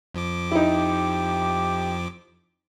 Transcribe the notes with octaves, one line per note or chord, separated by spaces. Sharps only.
F2 F3 D6
D#4 E4 G4